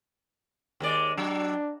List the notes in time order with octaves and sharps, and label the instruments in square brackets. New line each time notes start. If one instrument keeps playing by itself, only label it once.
[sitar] D#2 G#3 D5
[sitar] F#3 [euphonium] D4